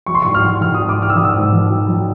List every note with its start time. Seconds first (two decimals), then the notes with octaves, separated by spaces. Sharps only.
0.06 F#3 C#6
0.15 C6
0.22 G#2 C#6
0.35 F6
0.43 F#3
0.61 D#3 F6
0.74 D#6
0.79 G#2
0.89 D6
0.97 F#3
1.02 F6
1.10 E6
1.15 D#3 D#6
1.25 E6
1.34 G#2
1.53 D#3
1.70 F#3
1.89 F#3